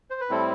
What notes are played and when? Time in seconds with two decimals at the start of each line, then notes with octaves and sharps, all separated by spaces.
0.10 C5
0.21 B4
0.29 A2 G3 C4 E4 A4